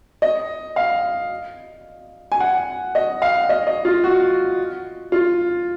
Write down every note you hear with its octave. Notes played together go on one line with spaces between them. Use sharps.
D#5
F5
G#5
F#5
D#5
F5
D#5
D#5
F4
F#4
F4